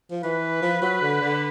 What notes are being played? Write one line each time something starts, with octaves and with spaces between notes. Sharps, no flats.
F3
E3 B4
F3
F#3
D3
D3